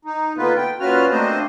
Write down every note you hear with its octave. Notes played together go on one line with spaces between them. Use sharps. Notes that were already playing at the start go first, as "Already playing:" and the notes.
D#4
D3 D#3 A#3 B3 F4 B4
G5
A#2 C#4 F4 F#4 B4 F6
A3 A#3 C4 D4 C5 D#5